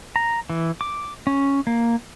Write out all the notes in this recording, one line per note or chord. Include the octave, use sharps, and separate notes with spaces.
A#5
E3
D6
C#4
A#3